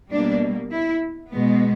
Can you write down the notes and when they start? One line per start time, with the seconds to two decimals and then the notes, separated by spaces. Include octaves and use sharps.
0.10 B2 G3 A#3 D4
0.71 E4
1.31 B2 G#3 B3